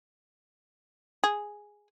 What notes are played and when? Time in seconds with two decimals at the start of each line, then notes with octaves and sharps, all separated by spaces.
1.24 G#4